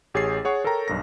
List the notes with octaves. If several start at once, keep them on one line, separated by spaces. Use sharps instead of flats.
A1 G4 G#4 C#5 A6 C7
G#4 C#5 F#5 C#6
A4 A#4 C#5 G5 A#5
B1 G2 A#6